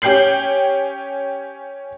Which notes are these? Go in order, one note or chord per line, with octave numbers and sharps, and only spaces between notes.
C#4 G4 G5 G6 C7 F#7